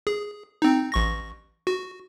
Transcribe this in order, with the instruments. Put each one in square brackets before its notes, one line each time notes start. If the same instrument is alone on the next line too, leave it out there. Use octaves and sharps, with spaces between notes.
[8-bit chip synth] G#4
C4 D#4
A1 C#6 A#6
F#4